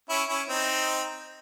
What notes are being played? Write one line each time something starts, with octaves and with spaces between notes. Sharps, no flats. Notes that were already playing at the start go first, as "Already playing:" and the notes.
C#4 E4
C#4 E4
C4 D#4